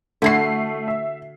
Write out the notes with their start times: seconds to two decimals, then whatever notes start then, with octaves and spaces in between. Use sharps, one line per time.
0.22 D3 A3 E4 F#4 C7
0.88 E5